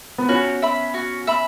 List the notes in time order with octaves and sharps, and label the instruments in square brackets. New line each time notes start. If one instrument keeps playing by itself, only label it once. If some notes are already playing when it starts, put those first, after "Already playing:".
[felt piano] B3
[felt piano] C#4 [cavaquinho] F#4
[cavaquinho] E5 B5
F#4
E5 B5